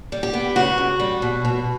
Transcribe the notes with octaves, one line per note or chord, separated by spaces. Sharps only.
G3
G4
B3
C#3 F#4
F#2
G3
B2
B2